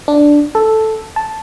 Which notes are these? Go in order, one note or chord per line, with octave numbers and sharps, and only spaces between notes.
D4
A4
A5